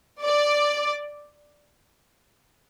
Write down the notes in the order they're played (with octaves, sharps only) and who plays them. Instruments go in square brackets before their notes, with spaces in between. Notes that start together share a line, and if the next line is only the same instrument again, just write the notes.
[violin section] D5